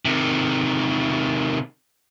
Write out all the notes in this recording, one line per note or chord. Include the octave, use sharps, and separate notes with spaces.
C3 D#3